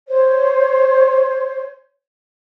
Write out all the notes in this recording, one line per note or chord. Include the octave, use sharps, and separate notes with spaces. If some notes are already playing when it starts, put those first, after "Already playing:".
C5 C#5